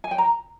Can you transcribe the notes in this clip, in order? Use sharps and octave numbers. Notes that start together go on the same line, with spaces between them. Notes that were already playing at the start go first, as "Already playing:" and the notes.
G#5
G5
A#5